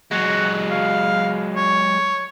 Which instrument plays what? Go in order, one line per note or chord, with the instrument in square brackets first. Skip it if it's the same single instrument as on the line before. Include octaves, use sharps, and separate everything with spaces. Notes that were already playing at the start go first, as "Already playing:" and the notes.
[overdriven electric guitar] F#3 G#3 [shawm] F#4
[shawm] F5
C#5